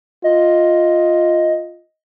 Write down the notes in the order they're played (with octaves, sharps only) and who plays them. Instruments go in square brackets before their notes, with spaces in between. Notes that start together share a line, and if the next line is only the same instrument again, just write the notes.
[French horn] F4 [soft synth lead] D#5